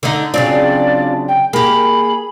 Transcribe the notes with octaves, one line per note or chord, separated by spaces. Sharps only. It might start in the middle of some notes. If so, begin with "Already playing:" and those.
D3 D#4
C#3 F#3 C4 D4 F4 D5
G5
A#3 G4 G#4 B5